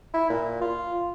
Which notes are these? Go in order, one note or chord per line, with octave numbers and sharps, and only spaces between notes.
E4
A#2
F4